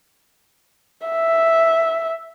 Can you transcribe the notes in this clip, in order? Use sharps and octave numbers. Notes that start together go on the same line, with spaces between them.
E5